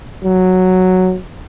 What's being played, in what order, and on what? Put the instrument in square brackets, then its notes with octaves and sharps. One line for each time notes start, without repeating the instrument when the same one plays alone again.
[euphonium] F#3